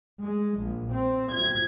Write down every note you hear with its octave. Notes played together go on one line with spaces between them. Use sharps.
G#3
A#1
C4
G#6